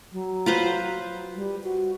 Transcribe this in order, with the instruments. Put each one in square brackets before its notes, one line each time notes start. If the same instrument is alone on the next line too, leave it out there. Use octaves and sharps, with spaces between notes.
[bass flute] F#3
[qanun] F4 B4 C5
[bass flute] G3
F#4